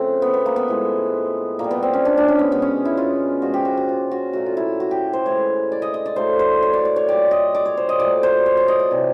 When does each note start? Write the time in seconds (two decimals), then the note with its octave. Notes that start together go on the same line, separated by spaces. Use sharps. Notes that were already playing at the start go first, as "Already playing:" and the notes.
Already playing: C#3 F3 A3 C4
0.22 B3
0.34 B3
0.46 A#3
0.56 B3
0.68 A2 F3 G#3
1.59 A#2 G3 A#3
1.71 B3
1.83 C4
1.93 C#4
2.05 D4
2.17 D4
2.28 C#4
2.39 B3
2.51 B2 G#3 B3
2.62 C#4
2.85 E4
2.97 F4
3.42 A#2 F3 G#3 F#4
3.54 G4
3.65 F#4
3.77 F#4
3.89 F4
4.11 F#4
4.33 A#2 F#3 A3 F#4
4.46 F4
4.57 E4
4.80 F#4
4.91 G4
5.13 C5
5.25 A2 E3 G#3 C#5
5.72 D5
5.82 D#5
5.94 D#5
6.06 D5
6.16 A2 F#3 A3 C5
6.39 C5
6.63 C#5
6.73 D5
6.85 D5
6.96 C#5
7.08 A#2 G3 D5
7.31 D#5
7.55 D5
7.65 C#5
7.77 C5
7.89 D#5
8.00 A#2 F#3 A3 D5
8.23 C5
8.46 C#5
8.57 D5
8.68 D#5
8.79 D5
8.91 C3 E3 G3